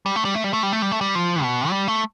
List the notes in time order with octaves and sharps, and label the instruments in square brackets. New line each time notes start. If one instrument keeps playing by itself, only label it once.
[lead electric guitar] G3
A3
G3
A3
G3
A3
G3
A3
G3
A3
G3
F3
B2
G3
A3